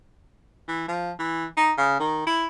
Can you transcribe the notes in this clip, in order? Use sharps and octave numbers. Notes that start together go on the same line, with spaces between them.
E3
F3
E3
D#4
C#3
D#3
E4